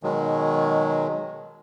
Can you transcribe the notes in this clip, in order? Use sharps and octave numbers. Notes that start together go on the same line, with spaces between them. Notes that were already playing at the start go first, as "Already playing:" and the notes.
B2 D#3 F#3 G#3